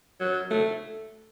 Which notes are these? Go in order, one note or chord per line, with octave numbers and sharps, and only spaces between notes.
F#3
A3